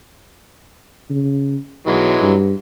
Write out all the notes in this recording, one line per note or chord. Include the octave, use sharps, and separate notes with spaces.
C#3
B1 E3 F#3 G#3
G2